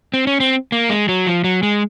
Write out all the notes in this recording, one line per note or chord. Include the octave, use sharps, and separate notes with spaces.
C4
C#4
C4
A#3
G#3
F#3
F3
F#3
G#3